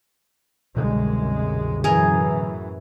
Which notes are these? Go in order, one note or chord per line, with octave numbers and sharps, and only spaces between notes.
C2 F#2 B2 D3 G#3
F#2 A2 E3 G#4 A#4